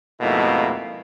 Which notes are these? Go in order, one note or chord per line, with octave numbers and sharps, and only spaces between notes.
F2 G#2 B2 A3 A#3 E4